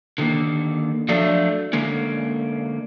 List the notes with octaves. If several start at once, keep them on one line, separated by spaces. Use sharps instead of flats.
D3 D#3 A#3
F3 F#3 A3 D4
D3 G#3 A#3 C#4